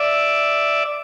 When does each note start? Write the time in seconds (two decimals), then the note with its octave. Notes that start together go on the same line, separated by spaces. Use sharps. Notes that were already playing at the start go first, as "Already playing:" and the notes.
Already playing: D5 E5